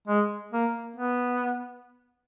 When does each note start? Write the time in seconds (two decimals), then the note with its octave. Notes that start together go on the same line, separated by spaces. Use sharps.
0.08 G#3
0.52 A#3
0.96 B3